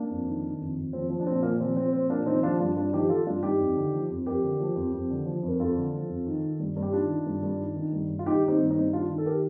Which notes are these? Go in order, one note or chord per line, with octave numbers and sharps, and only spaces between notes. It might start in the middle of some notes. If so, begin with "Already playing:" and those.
Already playing: A#3 D4
F2
D#3
D#3
F2
F2
F3 C4
F3
D4
A#2 C4
A#2 A#3
F3 C4
F3 C4
A#2 C4
A#2 A#3 D4
F3 C4 D#4
F3 D4 F4
G2 D4 F4
G2 D4 F4
F3 D#4 G4
F3 F4 A4
G2 D4 F4
G2 D#4 G4
F2
D3
F3
F2
F2 G4 A#4
D3
F3
F2
F2
D3
F3
F2
A#4
F2 F4 A4
D3
F3
F2
D#3
D#3
G2
G2
G4
D#3 D4 F4
D#3
G2
G2
D#3
D#3
G2
G2
F4
D#3 D#4 G4
D#3
C4 D#4
G2
C4 D#4
G2
D#3 D4 F4
D#3
A4
G4 A#4